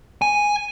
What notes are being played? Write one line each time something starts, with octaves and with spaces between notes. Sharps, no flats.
G#5